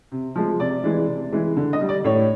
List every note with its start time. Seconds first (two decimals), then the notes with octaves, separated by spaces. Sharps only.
0.12 C3
0.35 F3 G#3
0.60 C3 D5
0.84 E3 G#3
1.07 C3
1.33 E3 G#3
1.56 D3
1.73 D#5
1.81 G3
1.89 D5
2.04 A2 C#5